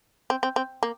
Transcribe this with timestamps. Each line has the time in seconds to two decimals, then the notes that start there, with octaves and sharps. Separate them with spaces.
0.30 C4
0.43 C4
0.56 C4
0.83 A#3